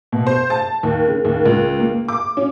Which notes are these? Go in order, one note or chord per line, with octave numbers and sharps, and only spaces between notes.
B2
C5
A5
D#2
C#3
D#2
C#2
A#3
D6
C#4